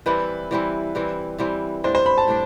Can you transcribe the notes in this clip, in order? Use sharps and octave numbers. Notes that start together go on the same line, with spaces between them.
E3 G3 C4 E4 B4
E3 G3 C4 E4
E3 G3 C4 E4
E3 G3 C4 E4
A2 G3 D4 C5
C5
B5
A5
A2 G3 D4